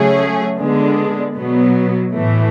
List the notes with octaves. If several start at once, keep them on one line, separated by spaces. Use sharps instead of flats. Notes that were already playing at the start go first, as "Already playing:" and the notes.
Already playing: C#3 F#3 A3 C#4 G#4
D3 G#3 B3 D4
B2 F#3 B3
A2 E3 A3